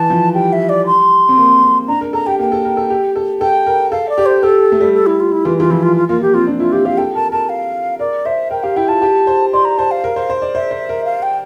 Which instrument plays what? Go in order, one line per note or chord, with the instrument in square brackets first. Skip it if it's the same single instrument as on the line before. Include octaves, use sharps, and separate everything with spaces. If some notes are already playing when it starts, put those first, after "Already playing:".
Already playing: [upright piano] E3 [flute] A5
[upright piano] F3
[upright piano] G3 [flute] G5
[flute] E5
D5
C6
[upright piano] C4
A#3
C4
[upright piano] D4 [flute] A#5
[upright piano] A#4
[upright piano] A4 [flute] A#5
[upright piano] G4 [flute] G5
[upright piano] A#3 [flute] G5
[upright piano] A4
A#4
A4
G4
A4
[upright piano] A4 [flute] G5
[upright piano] A#4
[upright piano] A4 [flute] F5
[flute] D5
[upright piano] G4
[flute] C5
[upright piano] G4 [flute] A4
[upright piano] A3
G3
[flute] A4
E4
F4
E4
[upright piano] E3 [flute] F4
[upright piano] E3 [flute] F4
[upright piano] F3 [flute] E4
[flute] F4
F4
[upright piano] A#3 [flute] F4
[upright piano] A#3 [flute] G4
[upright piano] C4 [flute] F4
[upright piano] D4
[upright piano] E4 [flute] F4
[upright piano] F4 [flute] G4
[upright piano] G4 [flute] F5
[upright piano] A4 [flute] G5
[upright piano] A#4 [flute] A5
[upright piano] A#4 [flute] A5
[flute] F5
[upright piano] A#4 [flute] D5
[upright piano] C5 [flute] E5
[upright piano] A#4 [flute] G5
[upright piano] G4 [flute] F5
[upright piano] E4 [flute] G5
[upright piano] F4 [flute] A5
[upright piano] G4
C5
[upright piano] D5 [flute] C6
[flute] A#5
[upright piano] C5 [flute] A5
[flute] F5
[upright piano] A#4
C5
C5
D5
[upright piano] C5 [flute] E5
[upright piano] C5
A#4
[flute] F5
G5